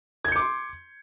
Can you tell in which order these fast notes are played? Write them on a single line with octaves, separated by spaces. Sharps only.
G#6 G6 C#7 D6 C6